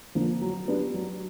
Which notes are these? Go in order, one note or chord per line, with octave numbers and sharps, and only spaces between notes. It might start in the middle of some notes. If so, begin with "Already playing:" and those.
D3 F3 A#3
F#3
B3 D4 G4
F#3